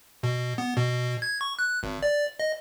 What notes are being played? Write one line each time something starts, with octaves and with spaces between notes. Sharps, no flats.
B2
B3
B2
G#6
C#6
F#6
G#1
D5
D#5